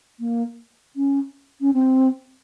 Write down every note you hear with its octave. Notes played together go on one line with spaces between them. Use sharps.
A#3
C#4
C#4
C4